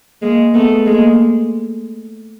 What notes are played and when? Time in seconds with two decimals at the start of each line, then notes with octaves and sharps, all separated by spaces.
0.22 G#3 A#3
0.54 A3 B3
0.86 G#3 A#3